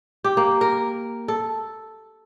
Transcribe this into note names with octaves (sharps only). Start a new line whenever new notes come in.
G4
A#3
A#4
A4